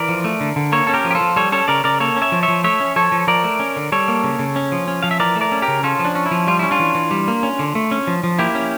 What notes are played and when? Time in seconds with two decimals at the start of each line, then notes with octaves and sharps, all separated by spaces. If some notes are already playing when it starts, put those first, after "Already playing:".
Already playing: E3 A#4 D5
0.09 F3
0.24 A3
0.41 D3
0.56 D3
0.72 A#3 A4 C#5
0.87 C#4 A4
0.94 G4 A#4
1.05 F3
1.10 G4
1.15 F4 A4
1.21 F3
1.36 G3 A4 C#5
1.52 C#4 A4 C#5
1.68 C#3 A#4 D5
1.84 C#3 A#4 D5
2.00 A#3 A4 C#5
2.16 C#4
2.22 C#5 E5
2.32 F3
2.43 C#5 E5
2.48 F3
2.64 A3 C#5 E5
2.80 C#4
2.96 F3 A4 C#5
3.12 F3
3.27 F3 A#4 D5
3.44 A3
3.60 C#4
3.76 D3
3.92 G3 A4 C#5
4.08 A#3
4.24 C#3
4.39 C#3
4.56 C#4
4.72 F3
4.88 C#4
5.03 F3 F5
5.11 E5
5.20 E3 A#4 D5
5.36 A3
5.41 A#4 D5
5.52 C#4
5.62 G4 A#4
5.68 C#3
5.83 C#4 F4 A4
5.99 F3
6.05 D4
6.15 C#4
6.26 E4
6.31 F3
6.47 G3 F4
6.59 C#4 E4
6.71 D4 F4
6.79 E3
6.95 E3
7.11 G3
7.28 A#3
7.43 C#4
7.59 D3
7.75 A3
7.91 C#4
8.07 F3
8.24 F3
8.39 A#3 E4 G4
8.55 C#4